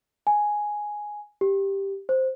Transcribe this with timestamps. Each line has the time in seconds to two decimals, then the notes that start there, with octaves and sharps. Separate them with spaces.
0.27 G#5
1.41 G4
2.09 C5